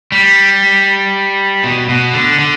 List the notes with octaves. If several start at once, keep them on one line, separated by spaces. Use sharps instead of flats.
G3
B2
B2
D3
D3